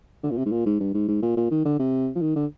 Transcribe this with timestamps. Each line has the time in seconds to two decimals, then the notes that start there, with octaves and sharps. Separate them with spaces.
0.23 D3
0.30 A#2
0.37 C3
0.45 G#2
0.52 A#2
0.66 G#2
0.80 G2
0.94 G#2
1.08 G#2
1.23 A#2
1.37 A#2
1.51 D#3
1.65 D3
1.79 C3
2.16 F3
2.22 D#3
2.36 D3